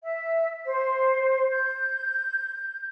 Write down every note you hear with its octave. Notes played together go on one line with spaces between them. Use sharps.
E5
C5
G6